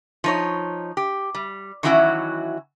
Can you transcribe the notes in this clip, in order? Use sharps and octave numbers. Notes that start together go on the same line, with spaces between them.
F3 D#4 C#5
G4
G3
D#3 E3 F#3 C#4 E4 F#4